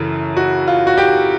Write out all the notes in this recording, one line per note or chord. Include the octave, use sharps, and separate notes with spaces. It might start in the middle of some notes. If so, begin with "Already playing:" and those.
Already playing: F#2 C#3 E3 A4
F#4
F4
F#4
G4